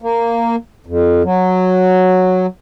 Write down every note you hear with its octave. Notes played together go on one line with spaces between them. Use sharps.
A#3
F2
F#3